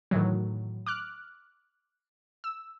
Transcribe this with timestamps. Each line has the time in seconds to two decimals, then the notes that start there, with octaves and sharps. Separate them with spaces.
0.11 A2 D#3 E3 F#3
0.86 D6 F6 F#6
2.44 E6